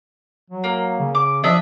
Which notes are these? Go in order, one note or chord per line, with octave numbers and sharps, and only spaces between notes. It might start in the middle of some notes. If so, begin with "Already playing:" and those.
F#3
A#3
C#3
D6
F3 D4 D#5 E5